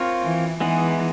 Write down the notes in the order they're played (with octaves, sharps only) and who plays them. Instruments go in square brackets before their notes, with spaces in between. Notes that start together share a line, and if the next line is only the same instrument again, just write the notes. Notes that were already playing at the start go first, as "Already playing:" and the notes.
Already playing: [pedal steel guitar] C4 F4 A#4 C#5
[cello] E3
[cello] E3 [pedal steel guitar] G#3 B3 D#4 G#4